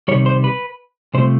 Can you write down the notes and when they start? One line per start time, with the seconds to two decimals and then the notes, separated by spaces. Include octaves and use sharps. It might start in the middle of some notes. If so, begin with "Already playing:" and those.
0.08 C2 C3 D#3 G3 C#5
0.26 C5
0.44 B4
1.14 C2 C3 F3 A3 C5